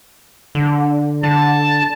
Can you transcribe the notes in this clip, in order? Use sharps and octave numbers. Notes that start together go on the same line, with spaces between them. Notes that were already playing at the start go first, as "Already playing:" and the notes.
D3
D3 A5